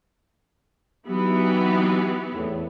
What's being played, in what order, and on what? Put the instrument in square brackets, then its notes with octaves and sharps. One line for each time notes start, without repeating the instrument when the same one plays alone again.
[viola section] E3 B3 [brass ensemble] F#3 D#4 G4
[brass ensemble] E2 A2